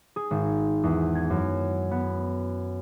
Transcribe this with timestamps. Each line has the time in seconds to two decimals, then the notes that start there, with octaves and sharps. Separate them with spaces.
0.16 G#4
0.31 G#1
0.83 E2
1.15 G#6
1.30 F#2
1.91 B3